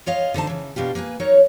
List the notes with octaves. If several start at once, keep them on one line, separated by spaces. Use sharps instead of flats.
F4 C#5 D#5 F5
D3 D#4 C5 A5
C#3 E3
B2 D4 F4 G4
A#3 B4 G5 G#5
F#3 D#4 A#4 C#5